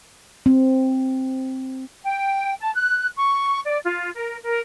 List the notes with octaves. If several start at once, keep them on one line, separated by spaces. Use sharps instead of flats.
C4
G5
A5
F#6
C#6
D5
F4
A#4
A#4